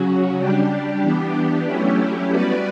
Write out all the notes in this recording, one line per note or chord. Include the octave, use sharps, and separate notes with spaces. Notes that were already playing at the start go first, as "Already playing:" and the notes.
Already playing: C#3 F#3 C#4 F#4
G3 D4 G4
E3 B3 D4 G4
F#3 A3 C#4 E4 G4
G3 B3 F#4 B4 D5